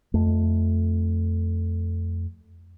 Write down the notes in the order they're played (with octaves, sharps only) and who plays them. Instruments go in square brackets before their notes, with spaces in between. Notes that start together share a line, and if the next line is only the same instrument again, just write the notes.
[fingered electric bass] F2 A3